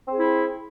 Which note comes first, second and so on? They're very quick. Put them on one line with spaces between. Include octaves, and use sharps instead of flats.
C4 G#4 E4